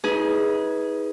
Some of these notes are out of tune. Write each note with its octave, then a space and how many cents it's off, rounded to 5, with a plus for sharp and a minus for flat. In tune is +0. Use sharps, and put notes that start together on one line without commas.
D#4 +40 G#4 +0 B4 +0